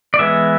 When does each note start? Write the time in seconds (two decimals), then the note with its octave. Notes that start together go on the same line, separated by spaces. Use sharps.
0.14 D5
0.19 E3 G#3 B3 E5